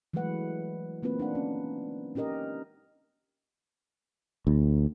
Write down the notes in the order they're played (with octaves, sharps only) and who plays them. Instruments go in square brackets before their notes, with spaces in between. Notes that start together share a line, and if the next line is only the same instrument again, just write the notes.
[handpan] E3 F#3 G#3 A3 B4 F#5
A3 A#3 C4 F4 B4
D4 D#4 F#5
C#4
C#4 D#4 G4 A#4 D#5
[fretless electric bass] D2